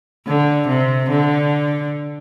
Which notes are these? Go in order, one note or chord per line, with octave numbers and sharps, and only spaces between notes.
D3
C3
D3